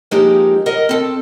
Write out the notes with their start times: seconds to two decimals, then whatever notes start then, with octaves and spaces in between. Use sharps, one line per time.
0.11 F3 G#3 A#3 C4 D#4 G4
0.66 A#4 D#5 F#5
0.89 C4 A4